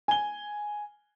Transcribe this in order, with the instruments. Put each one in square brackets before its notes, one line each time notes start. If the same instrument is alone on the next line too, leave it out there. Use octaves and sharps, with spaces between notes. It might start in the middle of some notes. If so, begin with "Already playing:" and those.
[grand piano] G#5 G7